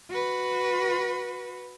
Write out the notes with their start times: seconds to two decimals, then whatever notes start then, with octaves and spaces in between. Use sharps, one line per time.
0.10 F#4 B4